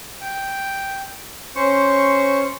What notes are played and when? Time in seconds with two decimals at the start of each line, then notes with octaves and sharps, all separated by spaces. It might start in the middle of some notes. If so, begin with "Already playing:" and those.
0.21 G5
1.56 C#4 C5 C#6